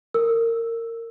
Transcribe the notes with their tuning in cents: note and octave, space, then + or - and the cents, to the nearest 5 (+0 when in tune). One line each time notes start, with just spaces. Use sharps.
A#4 -25 E6 +0